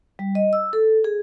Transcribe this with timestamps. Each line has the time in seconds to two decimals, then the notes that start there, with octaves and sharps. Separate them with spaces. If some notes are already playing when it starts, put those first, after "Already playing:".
0.19 G3
0.35 D#5
0.53 E6
0.73 A4
1.04 G#4